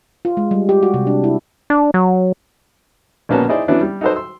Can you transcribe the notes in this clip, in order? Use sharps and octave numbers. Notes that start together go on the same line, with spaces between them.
F4
G#3
G3
G4
F#4
C3
D4
E4
D4
F#3
A#1 B2 A#3 B3 C#4 A5
D#4 E4 G#4 C5 D5 D#5
E3 F#3 B3 C#4 D4 E4
G3
D#4 F#4 A4 B4 C5
C6 E6